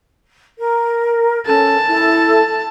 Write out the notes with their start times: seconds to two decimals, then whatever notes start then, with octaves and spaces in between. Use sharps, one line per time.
0.57 A#4
1.46 C#4 A4 A5
1.86 E4 A4